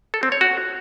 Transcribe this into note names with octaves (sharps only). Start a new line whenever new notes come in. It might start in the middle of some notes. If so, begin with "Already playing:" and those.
A4
C4
C#5
F#4